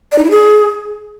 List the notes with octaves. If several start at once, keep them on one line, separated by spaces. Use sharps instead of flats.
D5
D#4
E4
G#4